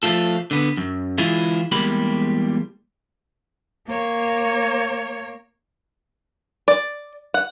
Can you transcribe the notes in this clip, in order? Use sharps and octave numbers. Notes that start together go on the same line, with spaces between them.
F3 A3 F4 A4
D3 B3
F#2
E3 G#3 E4 F4 G#4
E2 G3 G#3 A#3 G4 B5
A#3 C#5
D5
F#5